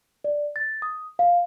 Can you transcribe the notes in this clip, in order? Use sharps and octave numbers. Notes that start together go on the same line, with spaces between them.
D5
A6
D#6
F5